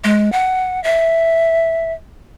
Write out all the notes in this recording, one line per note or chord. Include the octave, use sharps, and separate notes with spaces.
G#3
F#5
E5